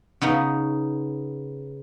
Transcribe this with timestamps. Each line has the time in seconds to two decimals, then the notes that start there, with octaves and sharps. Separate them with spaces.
0.21 C#3 B3 D#4